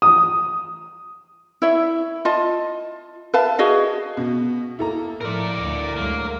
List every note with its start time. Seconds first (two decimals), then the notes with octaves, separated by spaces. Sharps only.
0.02 D#6
1.62 E4 C#5 E5
2.25 F4 D#5 A5
3.34 B4 E5 F5 A5
3.59 F#4 G#4 D#5 F5
4.17 B2
4.79 A#3 E4 A4 A#5
5.21 A2 F3 A#4 D5
5.59 D2
5.96 D2 F#3 G#3 A#3